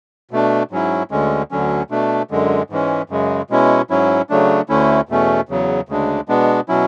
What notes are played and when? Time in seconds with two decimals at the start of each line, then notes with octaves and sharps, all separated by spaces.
0.31 B2 A3 D4
0.71 G#2 F#3 C#4 E4
1.11 D2 D3 G#3 C#4
1.51 D2 D3 F#3 C#4
1.90 B2 A3 D4
2.31 F#2 D3 G#3
2.70 G#2 E3 G#3 C#4
3.10 F#2 C#3 G#3
3.50 B2 G#3 C#4 E4
3.90 G#2 F#3 C#4 E4
4.30 C#3 F#3 A3 D4
4.69 D2 D3 A3 C#4 E4
5.09 E2 B2 A3 C#4
5.49 E2 C#3 F#3
5.89 D2 C#3 G#3 D4
6.28 B2 G#3 B3 D4
6.68 B2 F#3 C#4 E4